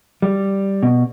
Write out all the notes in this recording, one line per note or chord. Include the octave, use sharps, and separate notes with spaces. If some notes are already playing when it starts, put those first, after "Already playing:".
G3
B2